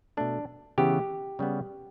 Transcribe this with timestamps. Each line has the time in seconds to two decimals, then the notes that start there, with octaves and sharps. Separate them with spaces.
0.17 B2 A3 D4
0.78 C#3 E3 B3 G4
1.39 C#3 G3 B3